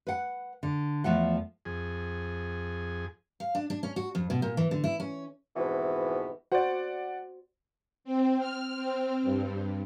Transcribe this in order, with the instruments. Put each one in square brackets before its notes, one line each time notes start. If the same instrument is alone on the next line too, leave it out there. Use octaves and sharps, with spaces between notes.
[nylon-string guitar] B4 F#5
D3
E2 F3 A3 F#5
[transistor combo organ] F2 G#4
[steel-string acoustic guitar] F5
D4
D4
C#4
F#4
F2
B2
A#2
E3
D3
E4
C#4
[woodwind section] F2 G#2 B2 E3
[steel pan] F#4 C5 [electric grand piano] D5 F#5
[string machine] C4
F6
C4
G2